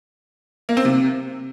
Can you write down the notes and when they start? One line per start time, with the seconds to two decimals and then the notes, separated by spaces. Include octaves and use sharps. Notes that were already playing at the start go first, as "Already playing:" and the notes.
0.69 A#3
0.77 C4
0.85 C3